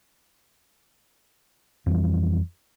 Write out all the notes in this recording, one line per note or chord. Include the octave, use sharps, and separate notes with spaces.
F2 E3 G3